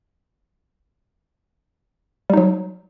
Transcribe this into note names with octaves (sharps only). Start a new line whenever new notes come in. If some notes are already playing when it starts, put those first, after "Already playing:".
F#3 G3 D#4